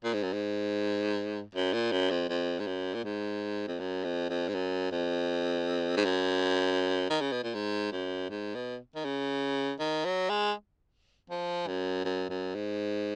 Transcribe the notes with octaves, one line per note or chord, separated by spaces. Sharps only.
A#2
G#2
F#2
G#2
F#2
A#2
F#2
F2
F2
G#2
F#2
A#2
G#2
F2
F#2
F2
F2
G#2
F#2
F2
G#2
F#2
D#3
C#3
B2
A#2
G#2
F#2
G#2
B2
D#3
C#3
D#3
F#3
G#3
F3
F#2
F#2
F#2
G#2